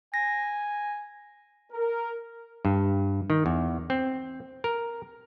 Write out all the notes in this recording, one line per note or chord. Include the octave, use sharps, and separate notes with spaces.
G#5 A#6
A#4
G2
D#3
E2
C4
A#4